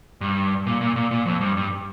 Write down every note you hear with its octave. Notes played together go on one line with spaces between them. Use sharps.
G2
A#2
A#2
A#2
A#2
F2
G2
G2